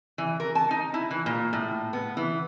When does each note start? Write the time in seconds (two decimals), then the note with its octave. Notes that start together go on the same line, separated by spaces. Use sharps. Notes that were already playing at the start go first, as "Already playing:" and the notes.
0.18 E3
0.40 A#4
0.55 A5
0.71 D#4
0.94 E4
1.11 E3
1.26 A#2
1.53 A2
1.93 B3
2.17 E3